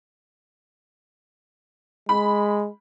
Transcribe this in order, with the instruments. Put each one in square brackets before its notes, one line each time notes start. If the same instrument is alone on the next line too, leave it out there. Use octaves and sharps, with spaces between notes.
[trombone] G#3 [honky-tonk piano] B5